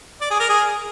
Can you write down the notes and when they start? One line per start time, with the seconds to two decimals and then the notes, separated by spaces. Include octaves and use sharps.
0.21 D5
0.31 G#4
0.40 A#4
0.49 G#4